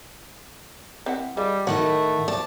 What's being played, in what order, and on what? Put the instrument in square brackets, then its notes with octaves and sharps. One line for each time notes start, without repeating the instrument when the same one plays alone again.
[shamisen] C4 E4 F#5
[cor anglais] G3 [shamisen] G#3 F4
[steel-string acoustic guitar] A2 D#3 F#5 [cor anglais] A3 [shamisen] F#4 C#5
[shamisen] F3 D5 [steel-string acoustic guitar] A5